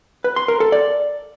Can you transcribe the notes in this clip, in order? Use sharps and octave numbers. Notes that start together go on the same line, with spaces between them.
B4
C6
A#4
A4
D5